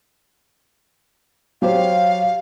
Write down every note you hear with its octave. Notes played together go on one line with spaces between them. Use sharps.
F#3 G4 C5 F5